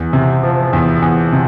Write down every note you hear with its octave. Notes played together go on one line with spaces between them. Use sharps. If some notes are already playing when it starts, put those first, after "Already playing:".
Already playing: E2
C3
F3
E2
E2
C3